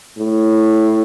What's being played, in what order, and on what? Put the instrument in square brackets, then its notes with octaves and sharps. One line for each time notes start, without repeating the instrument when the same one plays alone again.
[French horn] A2